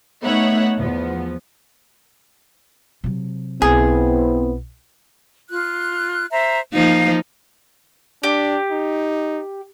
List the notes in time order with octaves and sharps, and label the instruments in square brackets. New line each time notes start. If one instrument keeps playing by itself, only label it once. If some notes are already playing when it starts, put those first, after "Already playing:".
[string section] A3 B3 D#4 C#5 E5 F#5
E2 F3 B3
[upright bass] C3 F#3
[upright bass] B1 [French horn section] B3 C4 E4 [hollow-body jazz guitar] G#4
[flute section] F4 F#6
C5 E5 A#5
[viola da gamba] F3 A#3 D#4 [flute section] F5
[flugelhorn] D4 [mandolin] G4
[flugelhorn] D#4